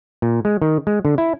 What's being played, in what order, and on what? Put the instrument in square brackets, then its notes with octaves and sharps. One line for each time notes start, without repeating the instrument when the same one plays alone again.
[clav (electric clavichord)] A#2
G#3
D#3
G#3
D3
E4